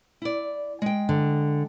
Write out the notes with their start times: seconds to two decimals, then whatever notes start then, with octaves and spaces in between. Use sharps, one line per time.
0.22 E4 D5
0.82 G#3 G5
1.09 D3